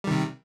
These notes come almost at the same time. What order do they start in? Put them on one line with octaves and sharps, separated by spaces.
G3 D#3 C3